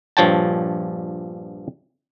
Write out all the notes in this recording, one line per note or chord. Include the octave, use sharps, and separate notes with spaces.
A#1 G2 F3 C#5 G5 A5